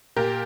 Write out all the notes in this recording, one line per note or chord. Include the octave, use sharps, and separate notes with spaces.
A#2 G4 A#4